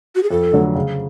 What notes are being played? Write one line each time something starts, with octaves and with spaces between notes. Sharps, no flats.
F#4
G#4
F2 A4
D3 F#3 A3
C#3